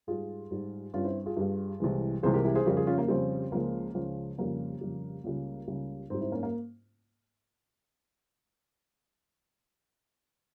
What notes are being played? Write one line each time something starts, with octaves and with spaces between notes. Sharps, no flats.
G#2 G3 F4 G#4
G#2 G3
G2 G3 C#4 F4
C4 E4
F4 G#4
G2 G3
C2 C3 E3 G#3
C2 C3 E3 G#3 G#4 C5
G4 A#4
E4 G4
G#4 C5
F2 C#3 G3 G4 A#4
F4 G#4
C#4 F4
A#3
F2 C#3 G3 C4
C#2 C#3 F3 G#3 A#3
C#2 C#3 F3 G#3
F2 C#3 G3 A#3
F2 C#3 G3
C#2 C#3 G3
C#2 C#3 G3
G#2 G3 C4
C4 E4
A#3 C#4
A#3